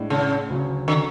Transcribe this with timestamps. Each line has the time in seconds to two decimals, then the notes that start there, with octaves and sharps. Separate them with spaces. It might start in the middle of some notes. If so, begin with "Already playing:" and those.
Already playing: A2 G#3 D4
0.10 C#3
0.48 D2 C#3 F#3 C#4
0.88 D3